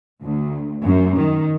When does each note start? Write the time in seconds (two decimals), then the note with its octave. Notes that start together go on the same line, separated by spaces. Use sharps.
0.23 D2
0.85 F#2
1.19 D#3